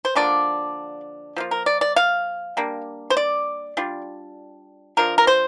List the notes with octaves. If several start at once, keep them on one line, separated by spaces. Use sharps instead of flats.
C5
D3 F3 A#3 D4 D5
F3 A#3 F4
A#4
D5
D5
F5
G3 A#3 D4
C5
D5
G3 D4 F4
F3 D4 F4 A#4
A#4
C5